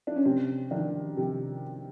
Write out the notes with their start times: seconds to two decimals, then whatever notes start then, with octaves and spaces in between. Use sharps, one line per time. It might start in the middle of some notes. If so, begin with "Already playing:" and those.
0.07 D4
0.16 C#4
0.25 C3 C4
0.71 D#3 D4
1.17 C3